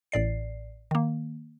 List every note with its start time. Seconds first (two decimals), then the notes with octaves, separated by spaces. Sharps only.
0.12 A1 A2 D5 C7
0.91 D#3 A#3